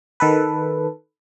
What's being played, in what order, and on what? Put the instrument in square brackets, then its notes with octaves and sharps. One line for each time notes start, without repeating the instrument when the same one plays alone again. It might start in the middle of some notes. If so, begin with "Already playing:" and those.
[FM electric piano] D#3 A4 B4